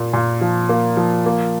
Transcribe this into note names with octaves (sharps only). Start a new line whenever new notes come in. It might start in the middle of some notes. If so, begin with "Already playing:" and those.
Already playing: A#2 A#3
A#2
F3
A#3
F3
A#3